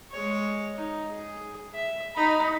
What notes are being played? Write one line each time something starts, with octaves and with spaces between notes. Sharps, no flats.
G#3 C#5
D#4
G#4
E5
D#4 B5